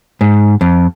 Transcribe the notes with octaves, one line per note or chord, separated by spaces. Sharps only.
G#2
F2